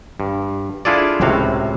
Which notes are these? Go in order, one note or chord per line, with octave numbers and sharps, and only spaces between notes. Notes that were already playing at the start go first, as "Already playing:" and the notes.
G2
D4 E4 F4 G#4 A4 D5
C#2 A2 C3 F#4 F5